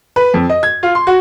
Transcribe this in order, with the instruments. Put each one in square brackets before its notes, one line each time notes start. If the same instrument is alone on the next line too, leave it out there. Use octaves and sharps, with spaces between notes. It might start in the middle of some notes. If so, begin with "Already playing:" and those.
[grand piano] B4
F2
D#5
G#6
F4
C6
F#4